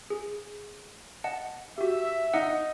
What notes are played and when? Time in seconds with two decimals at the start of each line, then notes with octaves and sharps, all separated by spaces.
0.10 G#4
1.24 D#5 F#5 A5
1.78 F#4 G4 E5
2.34 D#4 F#5